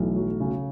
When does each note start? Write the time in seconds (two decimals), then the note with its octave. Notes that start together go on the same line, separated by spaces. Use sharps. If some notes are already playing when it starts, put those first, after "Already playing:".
Already playing: B1 E3 A3
0.16 F#3
0.40 C#3